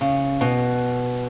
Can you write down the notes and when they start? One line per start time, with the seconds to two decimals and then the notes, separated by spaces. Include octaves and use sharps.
0.01 C#3
0.41 B2